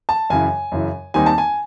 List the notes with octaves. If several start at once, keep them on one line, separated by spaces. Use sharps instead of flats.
A5
F#2 C#3 E3 G#5
F#2 C#3 E3
D#2 D#3 G3 C4 D#4 G#5
A5
G#5